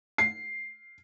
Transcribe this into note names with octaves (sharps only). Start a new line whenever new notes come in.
C7